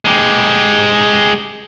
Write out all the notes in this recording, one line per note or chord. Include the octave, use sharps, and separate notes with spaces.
G#3 G4